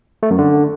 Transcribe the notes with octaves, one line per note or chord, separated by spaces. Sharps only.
A3
F#2
D3